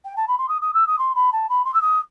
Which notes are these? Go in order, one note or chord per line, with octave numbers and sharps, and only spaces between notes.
G5
A5
B5
C6
D#6
D#6
E6
D#6
C6
B5
A5
B5
C6
E6
D#6